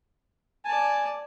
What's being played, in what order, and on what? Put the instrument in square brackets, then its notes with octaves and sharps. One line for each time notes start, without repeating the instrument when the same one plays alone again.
[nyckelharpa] D5 A5 [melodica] G#5